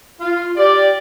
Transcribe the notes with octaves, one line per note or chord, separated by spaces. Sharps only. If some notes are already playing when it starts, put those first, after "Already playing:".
F4
G4 D5